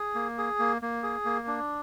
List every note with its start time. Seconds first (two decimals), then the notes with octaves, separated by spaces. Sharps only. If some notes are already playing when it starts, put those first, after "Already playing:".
Already playing: G#4
0.15 A#3
0.38 G#4
0.59 A#3
0.82 A#3
1.03 G#4
1.25 A#3
1.47 D4